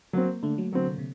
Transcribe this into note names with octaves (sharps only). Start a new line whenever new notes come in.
F#3 A#3 C4
D3 A3
F#3
D3 F#3 C4
C3
C3